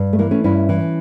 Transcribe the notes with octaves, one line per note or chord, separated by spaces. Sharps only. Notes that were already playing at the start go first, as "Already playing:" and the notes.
Already playing: G2
A3
E3 A#3
A3 C#4
G2 C#4 E4
E3